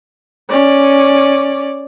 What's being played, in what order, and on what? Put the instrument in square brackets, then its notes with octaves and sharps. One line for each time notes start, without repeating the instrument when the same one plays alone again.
[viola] C#4 D5